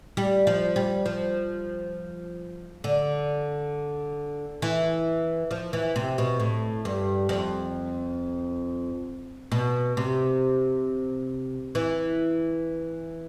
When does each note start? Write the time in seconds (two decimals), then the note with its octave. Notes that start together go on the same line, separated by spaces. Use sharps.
0.17 G3
0.47 F3
0.76 G3
1.06 F3
2.84 D3
4.62 E3
5.51 F3
5.73 E3
5.96 C3
6.18 B2
6.40 A2
6.85 G2
7.29 F2
9.52 B2
9.97 C3
11.75 E3